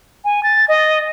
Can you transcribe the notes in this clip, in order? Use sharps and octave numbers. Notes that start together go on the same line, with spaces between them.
G#5
A6
D#5